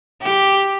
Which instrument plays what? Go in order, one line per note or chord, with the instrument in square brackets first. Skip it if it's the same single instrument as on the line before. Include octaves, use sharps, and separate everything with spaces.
[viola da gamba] G4